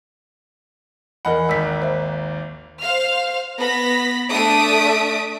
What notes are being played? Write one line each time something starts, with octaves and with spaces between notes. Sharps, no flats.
E2 A#4 D#5 F#5 B5
G#1 D#2 E6 B6
C5 E5
C5 F5 F6
B3 B5 A#6 B6
A3 D4 E5 D#6 B6 D7